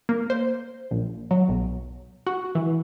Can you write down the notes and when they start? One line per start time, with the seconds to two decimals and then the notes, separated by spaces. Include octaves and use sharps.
0.09 A#3
0.30 C5
0.91 A#1
1.31 F#3
1.49 B1
2.27 F#4
2.55 E3